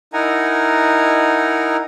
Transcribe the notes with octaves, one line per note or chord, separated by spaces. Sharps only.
D#4 E4 A#4 F#5 G#5 A#5